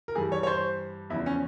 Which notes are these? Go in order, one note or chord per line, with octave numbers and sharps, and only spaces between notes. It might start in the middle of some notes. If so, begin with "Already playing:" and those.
A#4
G2 E3 G3 G#4
C#5
C#5
C5
E2 C#3 F3 E4
C#4